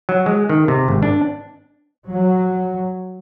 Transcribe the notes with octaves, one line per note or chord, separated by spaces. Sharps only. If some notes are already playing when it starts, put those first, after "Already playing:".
F#3
G#3
D#3
C3
G#1
D4
F#3